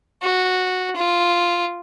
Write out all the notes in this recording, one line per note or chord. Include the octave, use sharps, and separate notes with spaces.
F#4
F4